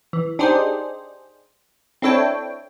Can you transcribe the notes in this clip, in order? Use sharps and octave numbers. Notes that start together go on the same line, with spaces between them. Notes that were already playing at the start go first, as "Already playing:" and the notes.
E3
D4 D#4 G4 G#4 C5
C4 D4 E4 A4 C#5 G5